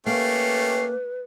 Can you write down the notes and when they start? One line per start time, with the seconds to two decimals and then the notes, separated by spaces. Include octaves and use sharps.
0.06 A3 A#3 C#4 G4 B4 C7